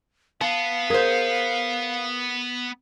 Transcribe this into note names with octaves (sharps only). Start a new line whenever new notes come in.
B3 F5 A5
G#4 A#4 C5